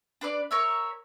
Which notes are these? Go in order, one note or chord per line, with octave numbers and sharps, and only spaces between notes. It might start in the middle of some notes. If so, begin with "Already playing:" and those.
D4 B4 D5
A#4 C#5 E5